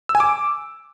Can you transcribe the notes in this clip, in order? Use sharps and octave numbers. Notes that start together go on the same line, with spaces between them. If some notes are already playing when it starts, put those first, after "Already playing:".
E6
G#5
D6